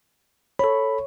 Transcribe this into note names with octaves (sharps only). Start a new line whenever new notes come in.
A4 C#5 B5